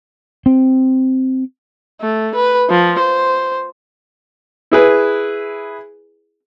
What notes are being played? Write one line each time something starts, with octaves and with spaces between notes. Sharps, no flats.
C4
A3
B4
F3
C5
E4 G#4 B4